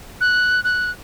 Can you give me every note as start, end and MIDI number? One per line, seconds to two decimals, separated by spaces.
0.21 0.63 90
0.64 0.91 90